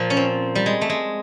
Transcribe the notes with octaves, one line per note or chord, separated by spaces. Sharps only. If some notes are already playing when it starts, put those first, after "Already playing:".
Already playing: A#2 F3
C#4
C4
G3
G#3
A3
G#3